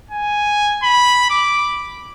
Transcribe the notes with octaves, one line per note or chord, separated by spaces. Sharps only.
G#5
B5
D6